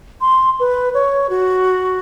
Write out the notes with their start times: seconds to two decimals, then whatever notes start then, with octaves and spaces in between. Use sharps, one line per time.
0.21 C6
0.60 B4
0.94 C#5
1.30 F#4